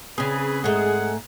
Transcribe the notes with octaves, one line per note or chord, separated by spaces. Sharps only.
C#3 C4 G#4 B4
G#2 G#3 A3 F#5